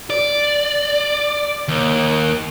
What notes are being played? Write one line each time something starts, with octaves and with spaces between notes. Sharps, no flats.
D5
D#2